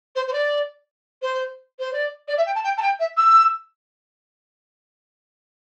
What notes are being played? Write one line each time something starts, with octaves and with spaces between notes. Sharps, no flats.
C5
C5
D5
C5
C5
D5
D5
E5
G5
A5
G5
A5
G5
E5
E6